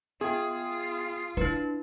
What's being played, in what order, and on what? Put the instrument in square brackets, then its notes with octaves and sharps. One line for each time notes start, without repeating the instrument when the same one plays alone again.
[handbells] B3 G5 [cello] F4 [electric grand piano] G#4
[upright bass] D4 [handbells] E4 B4